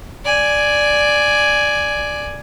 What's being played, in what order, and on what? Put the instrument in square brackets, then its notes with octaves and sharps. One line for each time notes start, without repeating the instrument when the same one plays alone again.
[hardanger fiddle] D5 G#5